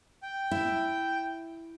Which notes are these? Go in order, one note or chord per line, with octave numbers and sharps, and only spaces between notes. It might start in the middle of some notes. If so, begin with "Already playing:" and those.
G5
E4